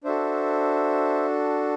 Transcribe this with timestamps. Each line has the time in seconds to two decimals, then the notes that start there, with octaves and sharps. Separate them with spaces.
0.04 D4 F#4 A4 C5 E5